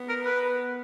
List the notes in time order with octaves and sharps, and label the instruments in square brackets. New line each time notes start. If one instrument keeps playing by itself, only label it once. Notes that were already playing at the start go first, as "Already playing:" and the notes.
Already playing: [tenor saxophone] B3
[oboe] A#4
B4